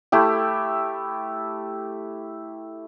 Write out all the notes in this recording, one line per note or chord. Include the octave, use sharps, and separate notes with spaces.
A3 E4 G4